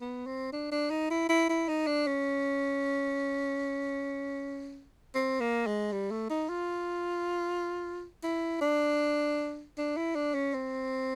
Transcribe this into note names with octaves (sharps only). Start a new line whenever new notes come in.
B3
C4
D4
D4
D#4
E4
E4
E4
D#4
D4
C#4
C4
A#3
G#3
G3
A3
D#4
F4
E4
D4
D4
E4
D4
C#4
C4